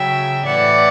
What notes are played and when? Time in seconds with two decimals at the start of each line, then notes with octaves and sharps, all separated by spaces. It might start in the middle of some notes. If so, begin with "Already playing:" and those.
Already playing: C#3 F#3 E5 G5
0.46 A2 E3 D5 F#5